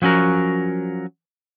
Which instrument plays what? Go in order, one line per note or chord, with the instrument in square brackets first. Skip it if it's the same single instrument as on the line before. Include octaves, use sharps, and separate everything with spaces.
[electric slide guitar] F3 F#3 C#4 F#4 A#4